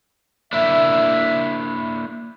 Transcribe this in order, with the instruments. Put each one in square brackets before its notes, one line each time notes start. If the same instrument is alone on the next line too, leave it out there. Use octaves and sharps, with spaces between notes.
[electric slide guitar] A#3 D4 E4 [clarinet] E5